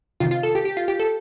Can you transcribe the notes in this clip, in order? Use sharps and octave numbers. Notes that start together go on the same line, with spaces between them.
C3 D#3 F4
F4
A4
G4
G4
F4
G4
A4